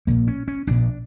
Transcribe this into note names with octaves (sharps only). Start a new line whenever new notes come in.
A#1 A#2 A#3
C#4
C#4
A#1 A#2 D4